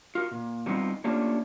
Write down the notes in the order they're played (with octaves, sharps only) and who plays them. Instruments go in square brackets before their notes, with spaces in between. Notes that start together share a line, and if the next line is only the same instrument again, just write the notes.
[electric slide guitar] F4 F#4 A#4
A#2
F#3 G3 B3 C4 D#4 F4
A3 A#3 C#4 D4 F4 G4